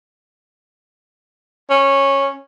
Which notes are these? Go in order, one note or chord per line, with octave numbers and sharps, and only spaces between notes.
C#4